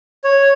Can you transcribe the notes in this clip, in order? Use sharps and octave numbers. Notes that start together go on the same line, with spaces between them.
C#5